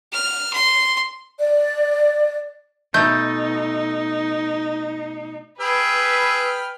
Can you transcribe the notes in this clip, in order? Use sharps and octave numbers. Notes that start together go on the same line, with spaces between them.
F6
C6
D5
B2 A3 D#4 G6
G#4 B4 G5 B5 E6 F6